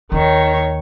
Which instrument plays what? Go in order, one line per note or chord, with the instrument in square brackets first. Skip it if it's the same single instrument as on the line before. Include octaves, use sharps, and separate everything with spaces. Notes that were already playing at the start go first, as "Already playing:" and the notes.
[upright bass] D#2 [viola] D#3 C#5